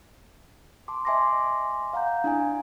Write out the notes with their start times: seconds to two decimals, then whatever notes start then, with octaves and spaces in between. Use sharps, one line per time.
0.88 A5 C6 D6
1.05 D#5 E5 G#5 C6 D6 A#6
1.93 F5 F#5 A#5 G6
2.24 D4 E4 G#5